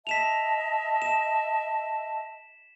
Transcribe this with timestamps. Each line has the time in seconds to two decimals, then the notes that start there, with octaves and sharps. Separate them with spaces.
0.07 D#5 E5 A5 B6 E7 F7
1.02 E7